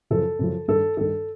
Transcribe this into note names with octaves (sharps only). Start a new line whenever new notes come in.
F#2 C#3 F3 A4
F#2 C#3 F3
G2 D#3 A4
G2 D#3 A4